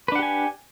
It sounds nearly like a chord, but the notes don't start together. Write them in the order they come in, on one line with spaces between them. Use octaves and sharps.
B4 D4 F#5 G4 G#5